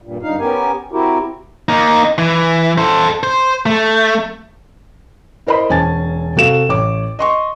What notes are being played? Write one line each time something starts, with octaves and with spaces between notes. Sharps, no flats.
G2 A#2
G2 D3 D#4 F5
B3 C#4 G4 A#4 G#5
C4 E4 F#4 G4 A#4
A#3 D#4
E3
A4 C5
C5
A3
E4 A#4 C5 D#5 B5
E1 C#4 G#5 A5 A6
C3 F#4 A4 F5 E7
A1 C#5 D6
D#5 C6 C#6